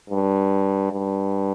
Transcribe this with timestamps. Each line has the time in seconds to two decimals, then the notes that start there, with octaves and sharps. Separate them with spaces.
0.09 G2
0.92 G2